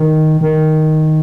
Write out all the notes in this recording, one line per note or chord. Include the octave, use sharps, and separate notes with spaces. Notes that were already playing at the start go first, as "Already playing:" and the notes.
Already playing: D#3
D#3